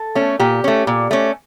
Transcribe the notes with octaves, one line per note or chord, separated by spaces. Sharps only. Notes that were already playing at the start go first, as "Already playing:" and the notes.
Already playing: A4
A3 C#4
A#2 G4
A3 C#4
A#2
A3 C#4